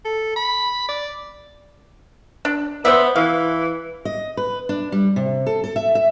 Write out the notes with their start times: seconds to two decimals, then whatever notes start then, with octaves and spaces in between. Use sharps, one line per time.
0.05 A4
0.36 B5
0.89 D5
2.45 D4
2.85 B3 C5 D5 E5
3.16 E3 F5
4.05 D#5
4.37 B4
4.69 D4
4.92 G3
5.16 C3
5.47 A4
5.64 A4
5.76 E5
5.95 E5